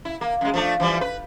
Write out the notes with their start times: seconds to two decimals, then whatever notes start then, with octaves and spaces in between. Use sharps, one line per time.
0.05 E4
0.21 A#3
0.41 F#2 G#3
0.54 F3 A3 D4
0.80 E3 F3 G3
1.01 B4